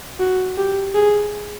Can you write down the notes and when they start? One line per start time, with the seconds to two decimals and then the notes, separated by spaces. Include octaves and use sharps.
0.20 F#4
0.58 G4
0.95 G#4